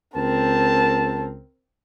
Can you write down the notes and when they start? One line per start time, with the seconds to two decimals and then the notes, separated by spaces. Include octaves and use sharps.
0.16 C#2 C4 A#4 A5